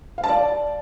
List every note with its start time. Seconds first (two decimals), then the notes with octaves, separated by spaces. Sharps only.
0.18 F5
0.24 A5
0.29 D5